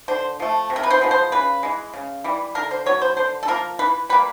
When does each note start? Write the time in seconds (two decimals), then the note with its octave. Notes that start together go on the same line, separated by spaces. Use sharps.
0.08 D3 C5
0.40 F3 A3
0.70 C3
0.76 A#4
0.83 B4
0.90 C5
1.01 F3 G#3 B3
1.11 C5
1.32 C#3 B4
1.63 E3 G#3
1.93 C#3
2.24 E3 G3
2.55 D3 A#4
2.71 C5
2.86 F#3 B3 C#5
3.01 C5
3.17 D3 C5
3.43 A4
3.48 F3 A#3 A#4
3.79 E3 B4
4.09 G3 B4
4.13 A#3